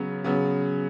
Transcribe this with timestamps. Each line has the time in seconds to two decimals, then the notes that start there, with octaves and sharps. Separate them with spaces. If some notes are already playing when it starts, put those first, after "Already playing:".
Already playing: C#3 F#3 B3
0.24 C#3 F#3 B3